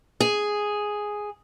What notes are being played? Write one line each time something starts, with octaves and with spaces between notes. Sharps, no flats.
G#4